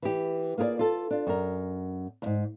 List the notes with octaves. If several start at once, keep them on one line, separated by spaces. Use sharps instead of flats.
E3 G4
A#3 F4 G#4 A#4 D5
F4 A4
D4 F4
F#2 A#4
E2 G#2